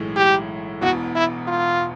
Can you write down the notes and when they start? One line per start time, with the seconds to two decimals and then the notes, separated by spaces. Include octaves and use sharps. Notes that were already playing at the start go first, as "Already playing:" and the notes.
Already playing: B1 A2 E3 G#3
0.16 G4
0.82 E1 E2 B2 F#4
1.15 E4
1.47 F4